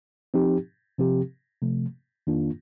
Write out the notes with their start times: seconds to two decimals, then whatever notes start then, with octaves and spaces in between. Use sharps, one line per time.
0.34 F3 C4 D#4 G4
0.98 C3 F3 C4 G4
1.62 C3 F3 A3
2.27 F2 D#3 A#3 D4 F4